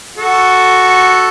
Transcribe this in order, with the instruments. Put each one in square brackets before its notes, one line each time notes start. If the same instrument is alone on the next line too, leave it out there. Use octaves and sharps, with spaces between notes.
[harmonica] F#4 A4